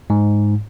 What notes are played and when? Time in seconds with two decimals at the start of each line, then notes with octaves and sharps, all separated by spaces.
0.10 G#2